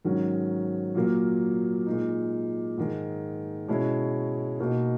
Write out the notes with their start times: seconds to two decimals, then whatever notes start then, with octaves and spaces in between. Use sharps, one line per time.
0.05 G#2 D#3 F#3 C#4
0.95 A#2 F#3 A#3
1.86 A#2 G#3 D#4
2.77 G#2 D#3 G#3
3.68 B2 G#3 C#4 E4
4.60 B2 A#3 D#4